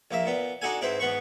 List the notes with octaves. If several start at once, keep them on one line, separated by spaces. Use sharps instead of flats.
A#1 A#3 E5
A#2 B3
D4 D#4 F#4 A4 G#5
G#2 C4 E4 B4 C5
G#2 B3 B4 C#6